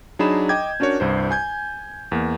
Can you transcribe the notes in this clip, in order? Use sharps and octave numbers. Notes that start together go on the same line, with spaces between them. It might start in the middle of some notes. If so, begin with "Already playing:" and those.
F#3 D4 D#4 G#4 B5 E7
D#5 G5 D6 G6 G#6
C#4 D4 F#4 A#4 C#5
C2 G2 C5
G#5 G6 G#6
E2 A#3